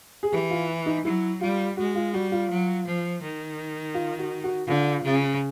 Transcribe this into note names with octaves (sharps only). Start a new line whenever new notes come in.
G#4
E3 G4
F4
D#4
F#3 E4
G3 F4
G#3 F#4
F4
G3 F#4
F4
F#3
F3
D#3
F4
F#4
F#4
D3 F4
C#3